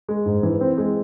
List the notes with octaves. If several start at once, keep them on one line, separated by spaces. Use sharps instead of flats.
G#3
G#2
E3
C4
G#3